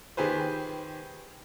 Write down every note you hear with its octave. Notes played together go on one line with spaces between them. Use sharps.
D#3 G4 G#4 B4 C5